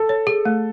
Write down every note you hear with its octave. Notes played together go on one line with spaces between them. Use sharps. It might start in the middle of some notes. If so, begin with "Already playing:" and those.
Already playing: A4
C#5
G#4
A3